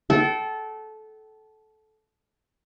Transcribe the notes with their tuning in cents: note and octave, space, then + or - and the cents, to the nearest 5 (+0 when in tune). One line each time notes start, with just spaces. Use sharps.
A4 -20 G5 -45